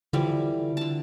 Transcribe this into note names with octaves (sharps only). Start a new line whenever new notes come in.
D3 E3 F3 G3
D3 A5